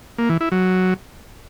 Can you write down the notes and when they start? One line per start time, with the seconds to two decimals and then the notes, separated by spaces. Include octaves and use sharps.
0.18 A#3
0.29 E3
0.41 E4
0.52 F#3